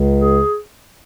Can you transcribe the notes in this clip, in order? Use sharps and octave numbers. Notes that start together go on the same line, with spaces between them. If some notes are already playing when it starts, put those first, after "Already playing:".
Already playing: C#2 C#3
G#4